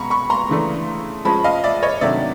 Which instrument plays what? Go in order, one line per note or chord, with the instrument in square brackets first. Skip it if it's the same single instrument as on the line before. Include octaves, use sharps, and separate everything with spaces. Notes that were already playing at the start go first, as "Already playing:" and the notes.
Already playing: [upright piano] B2 G#3 C#4 A#5 B5 C#6
B5 C#6
A#5 C6
C#3 E3 A3 D4
F3 G#3 C#4 A5 B5
D#5 F5
D5 E5
C#5 D#5
C3 D#3 F#3 A3 D4 D5 E5